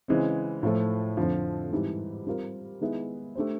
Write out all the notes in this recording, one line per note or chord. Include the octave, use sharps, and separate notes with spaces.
C#3 E3 G#3 C4
A2 F3 A3
F2 D3 F3
G#2 E3 G3 C4
G3 C4 F4 A#4
D#3 G#3 B3 E4
A3 D4 G4 C5